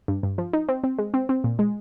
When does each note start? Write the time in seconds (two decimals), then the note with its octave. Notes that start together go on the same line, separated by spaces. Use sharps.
0.08 G2
0.23 G2
0.38 F3
0.53 D#4
0.69 C4
0.84 C4
0.99 G#3
1.14 C4
1.29 C4
1.44 A#2
1.59 G#3